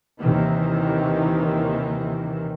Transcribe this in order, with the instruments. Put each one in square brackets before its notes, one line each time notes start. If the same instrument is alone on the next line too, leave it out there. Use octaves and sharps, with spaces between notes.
[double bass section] D#2 C3 D#3 E3